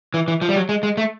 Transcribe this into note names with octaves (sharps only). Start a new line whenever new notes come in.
E3
E3
F3
G3
F#3
G#3
G#3
A3